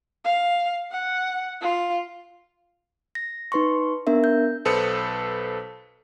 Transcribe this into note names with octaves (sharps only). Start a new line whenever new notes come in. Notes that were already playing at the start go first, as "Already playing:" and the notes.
F5
F#5
F4
A#6
D#4 B4 C6 C#6
B3 D4 A#4 E5
G6
B1 A4 B4 C5 D#6 C#7